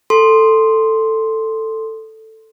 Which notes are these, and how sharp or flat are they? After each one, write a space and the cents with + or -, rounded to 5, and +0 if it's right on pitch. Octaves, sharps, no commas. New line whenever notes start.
A4 +10 C6 +0